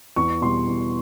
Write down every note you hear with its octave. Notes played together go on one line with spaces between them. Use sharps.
E2 C#6
B2 G3 C6
E2